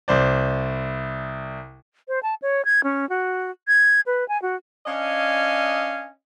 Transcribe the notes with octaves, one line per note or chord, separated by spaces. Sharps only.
C2 C5 D5
C5
A5
C#5
G#6
C#4
F#4
G#6
B4
G#5
F#4
C#4 D4 D#5 F5 G#5